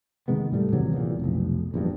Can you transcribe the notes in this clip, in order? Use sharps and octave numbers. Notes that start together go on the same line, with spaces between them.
C3 D#3 G#3 B3
A2 G3 A3
G#1 C3 E3 F#3
E2 A#2
F1 B1
A#1 E2 G2